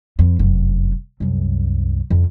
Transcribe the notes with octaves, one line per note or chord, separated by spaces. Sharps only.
F2
F1 F#2
C2 F#2
F2 C#3